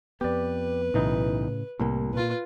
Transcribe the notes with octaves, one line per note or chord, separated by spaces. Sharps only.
F2 B3 G4 B4 D5
B1 A2 C#3 E3 D#4
C2 A2 G3 A#3
A#2 F4 B4